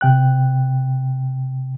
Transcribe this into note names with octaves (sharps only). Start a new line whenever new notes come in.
C3 G5 F#6